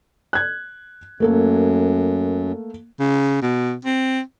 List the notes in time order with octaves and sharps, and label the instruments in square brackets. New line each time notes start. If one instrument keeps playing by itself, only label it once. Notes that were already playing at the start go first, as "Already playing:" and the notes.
[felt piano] F#6 G#6
[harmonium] F#2 [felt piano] A3 A#3 A4
[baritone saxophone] C#3
B2
C4